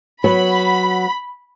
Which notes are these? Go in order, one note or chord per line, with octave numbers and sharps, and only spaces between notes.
F#3 B3 B5